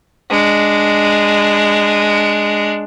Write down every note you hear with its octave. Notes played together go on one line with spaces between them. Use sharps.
G#3 D4